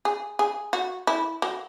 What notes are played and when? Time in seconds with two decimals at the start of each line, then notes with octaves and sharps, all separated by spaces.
0.05 G#4
0.39 G#4
0.73 F#4
1.07 E4
1.42 F#3